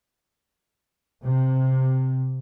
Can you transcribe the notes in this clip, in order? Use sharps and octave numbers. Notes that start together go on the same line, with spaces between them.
C3